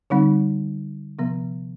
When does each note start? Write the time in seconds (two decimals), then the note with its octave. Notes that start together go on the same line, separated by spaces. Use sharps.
0.10 D3 G3 C4 D#4
1.19 C3 F3 B3